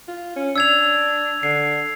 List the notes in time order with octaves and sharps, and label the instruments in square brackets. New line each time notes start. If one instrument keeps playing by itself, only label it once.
[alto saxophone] F4
C#4
[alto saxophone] D4 [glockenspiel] E6 G#6 F7
[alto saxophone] D3 [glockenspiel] C7